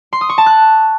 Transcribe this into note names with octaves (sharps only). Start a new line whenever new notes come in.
C6
D#6
C#6
A5
F#6